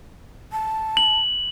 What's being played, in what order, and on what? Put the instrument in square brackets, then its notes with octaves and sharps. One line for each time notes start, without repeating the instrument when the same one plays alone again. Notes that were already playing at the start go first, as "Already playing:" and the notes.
[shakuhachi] A5
[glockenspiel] F#7